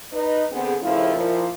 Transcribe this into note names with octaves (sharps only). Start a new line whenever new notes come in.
D#4 B4 D#5
D3 B3 C4 G#4
D#2 C#3 F3 A3 E4 F4
A#2 F3 E4